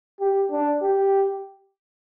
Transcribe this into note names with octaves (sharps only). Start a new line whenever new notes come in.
G4
D4
G4